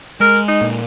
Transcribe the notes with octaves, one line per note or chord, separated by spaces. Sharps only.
G#3 A#4
D#4
A#2